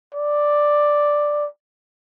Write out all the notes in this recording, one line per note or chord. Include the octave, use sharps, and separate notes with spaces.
D5